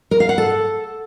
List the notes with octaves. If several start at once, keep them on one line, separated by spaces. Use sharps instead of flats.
A#4
F5
F#5
A4